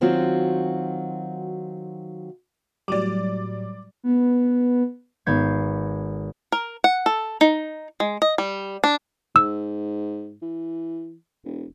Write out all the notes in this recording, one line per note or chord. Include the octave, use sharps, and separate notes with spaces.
D#3 F#3 C4 F4 F#4
A2 F#3 G3 D5 D6
B3
G#1 B3 G6 G#6 C7
A#4
F#5
A4
D#4
G#3
D#5
G3
D4
G#2 E6
E3
E1